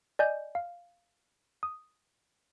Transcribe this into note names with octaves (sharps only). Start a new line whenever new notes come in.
D5 D#5 G#5 G6
F5
D#6